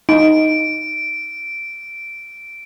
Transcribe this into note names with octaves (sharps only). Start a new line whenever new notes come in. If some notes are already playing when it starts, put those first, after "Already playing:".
D#4 D7